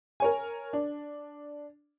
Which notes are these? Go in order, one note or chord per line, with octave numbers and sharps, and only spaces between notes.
A#4 C#5 G#5
D4